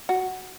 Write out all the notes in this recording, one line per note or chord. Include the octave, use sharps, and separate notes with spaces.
F#4